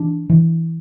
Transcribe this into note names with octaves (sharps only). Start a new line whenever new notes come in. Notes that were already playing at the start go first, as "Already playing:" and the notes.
Already playing: E3 D4
E3